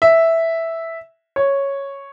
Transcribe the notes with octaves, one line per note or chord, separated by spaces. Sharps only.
E5
C#5